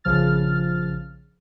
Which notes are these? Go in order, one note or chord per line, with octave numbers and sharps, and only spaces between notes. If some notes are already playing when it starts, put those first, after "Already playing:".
A#1 C#3 F3 F6 A6